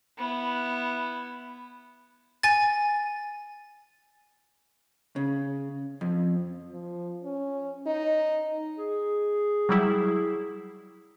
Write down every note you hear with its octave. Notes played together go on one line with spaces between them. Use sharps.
B3 E4
G#5 A6
C#3
F2
F3
C#4
D#4
G#4
F#3 G3 E4